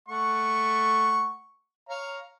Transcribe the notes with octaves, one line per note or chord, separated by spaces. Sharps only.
A3 F#5 C#6
C#5 F5 A#5